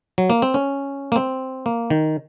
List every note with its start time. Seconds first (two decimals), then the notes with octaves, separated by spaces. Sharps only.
0.18 F#3
0.30 A#3
0.42 C4
0.54 C#4
1.12 A#3
1.16 C4
1.66 A#3
1.90 D#3